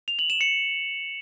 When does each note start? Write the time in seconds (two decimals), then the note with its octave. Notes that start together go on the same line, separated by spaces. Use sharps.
0.08 F7
0.19 F#7
0.30 E7
0.41 C#7